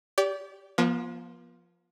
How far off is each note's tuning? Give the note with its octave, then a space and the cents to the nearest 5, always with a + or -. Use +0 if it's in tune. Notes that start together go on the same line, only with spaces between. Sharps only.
G4 +0 D5 -35
F3 +0 B3 -45